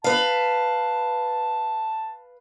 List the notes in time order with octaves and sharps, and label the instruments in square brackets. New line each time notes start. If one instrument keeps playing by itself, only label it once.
[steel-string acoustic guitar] B4 F5 [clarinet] A5